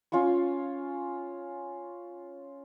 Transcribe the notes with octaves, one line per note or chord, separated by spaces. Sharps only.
C#4 F4 F5 C#6